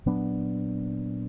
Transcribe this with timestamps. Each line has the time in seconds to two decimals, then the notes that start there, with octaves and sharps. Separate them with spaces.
0.06 A#2 F#3 B3 D4